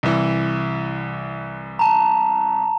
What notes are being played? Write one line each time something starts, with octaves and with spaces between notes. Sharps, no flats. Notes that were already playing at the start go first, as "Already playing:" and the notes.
C2 E3
A5 A#5